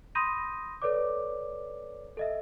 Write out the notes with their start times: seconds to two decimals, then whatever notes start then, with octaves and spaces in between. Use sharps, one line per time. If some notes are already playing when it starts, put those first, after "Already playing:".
0.15 B5 C6 D#6 G6 A#6 D#7
0.82 A4 B4 C#5 D5 D6
2.17 A4 D#5 E5